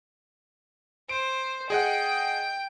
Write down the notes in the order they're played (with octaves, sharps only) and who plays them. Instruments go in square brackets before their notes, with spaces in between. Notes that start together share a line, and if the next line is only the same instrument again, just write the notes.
[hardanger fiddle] C5 [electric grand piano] D7
[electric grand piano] G#4 D#5 F#5 [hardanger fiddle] G5